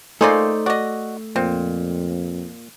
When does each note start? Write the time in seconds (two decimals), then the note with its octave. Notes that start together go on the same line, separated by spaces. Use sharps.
0.21 A3 A#3 D#4 F4 G#4 C5 D5
0.66 F#4 D5 D#5
1.36 F2 A#2 C4